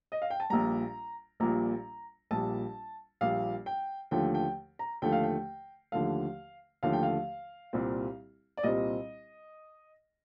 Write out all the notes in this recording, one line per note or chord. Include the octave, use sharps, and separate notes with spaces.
D#5
F5
G5
A5
A#1 A#2 G3 A#5
A#1 A#2 G3 A#5
A#1 A#2 G3 A5
A#1 A#2 G3 F5
G5
D#2 D3 F3 A3 G5
G5
A#5
D#2 D3 F3 A3 G5
F5
G5
D#2 D3 F3 A3 F5
D#2 D3 F3 A3 F5
G5
F5
C2 A#2 G3 C4
D5
C2 A#2 G3 C4 D#5